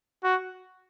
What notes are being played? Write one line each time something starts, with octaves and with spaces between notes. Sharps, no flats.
F#4